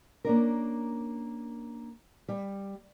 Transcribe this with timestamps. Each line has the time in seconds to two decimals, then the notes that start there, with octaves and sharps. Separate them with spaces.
0.24 A#3 C#4 D4 A#4
2.28 G3